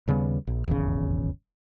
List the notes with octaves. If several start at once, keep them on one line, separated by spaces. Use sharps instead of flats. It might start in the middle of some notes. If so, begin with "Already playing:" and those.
D#2 C#3 G3 B3
A#1
D#1 G#1 E2 C#3